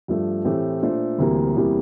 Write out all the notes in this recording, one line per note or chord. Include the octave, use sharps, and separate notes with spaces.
G2 F3 A3
A2 E3 A3 C4 G4
A#2 A3 D4 A4 C5
D2 C3 E3 G3 A#3
E2 C3 E3 G3 A#3